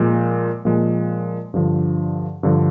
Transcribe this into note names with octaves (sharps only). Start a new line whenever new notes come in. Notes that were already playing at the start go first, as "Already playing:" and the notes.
Already playing: A#2 F3 G#3
A#2 F3 G#3
G2 D3 F3
G2 D3 F3